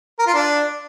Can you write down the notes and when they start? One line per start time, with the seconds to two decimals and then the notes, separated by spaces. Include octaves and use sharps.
0.19 A#4
0.27 F4
0.34 D4